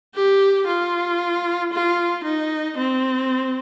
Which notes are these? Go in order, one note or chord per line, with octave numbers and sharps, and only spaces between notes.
G4
F4
F4
D#4
C4